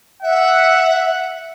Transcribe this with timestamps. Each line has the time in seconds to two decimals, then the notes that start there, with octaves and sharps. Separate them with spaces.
0.23 E5 F#5